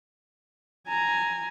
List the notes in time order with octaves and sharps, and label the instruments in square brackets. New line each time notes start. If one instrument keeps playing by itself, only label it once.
[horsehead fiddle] G#5 A#5